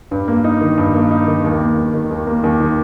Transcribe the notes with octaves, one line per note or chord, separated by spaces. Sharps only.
G2
A#3
D#4
D#3
G2
A#3
D#4
D#3
D#2
A#3
D#2
D#3
D#2
A#3
D#2
D#3